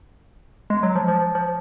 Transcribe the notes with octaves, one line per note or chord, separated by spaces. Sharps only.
G#3
F#3
F3
F3
F3